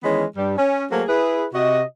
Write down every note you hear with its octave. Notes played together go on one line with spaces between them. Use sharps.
D#3 E3 G#3 B3 C#4
G2 G3
C#4
F#3 A3 A#3 F#4 G#4 C5
E4 G#4 B4
C3 F#4 D#5